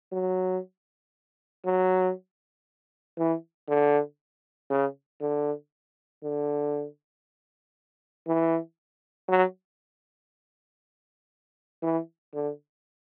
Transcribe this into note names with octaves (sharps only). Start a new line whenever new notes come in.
F#3
F#3
E3
D3
C#3
D3
D3
E3
F#3
E3
D3